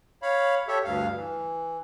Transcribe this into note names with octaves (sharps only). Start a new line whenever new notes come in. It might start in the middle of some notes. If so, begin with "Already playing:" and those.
C#5 F5 B5
G4 A4 C#5 E5
D2 G2 F5
E3